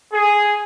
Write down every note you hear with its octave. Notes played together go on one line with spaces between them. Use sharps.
G#4